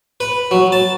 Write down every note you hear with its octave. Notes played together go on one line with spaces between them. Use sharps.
B4
F#3
A5